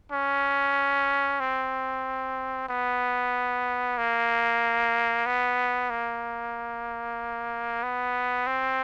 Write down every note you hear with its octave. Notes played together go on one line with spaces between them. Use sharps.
C#4
C4
B3
A#3
B3
A#3
B3
C4